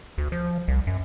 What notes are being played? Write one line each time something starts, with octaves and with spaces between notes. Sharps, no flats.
D2
F3
C2
F#2